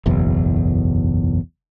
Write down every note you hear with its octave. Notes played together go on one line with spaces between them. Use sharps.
F#1 B1 E2